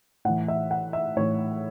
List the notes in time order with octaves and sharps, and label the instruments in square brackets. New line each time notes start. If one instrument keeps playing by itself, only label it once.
[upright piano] A2 E3 F#5
E5
F#5
E5
A2 E3 C#5